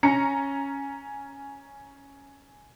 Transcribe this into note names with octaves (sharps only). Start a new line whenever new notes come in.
C#4 A#5 C#7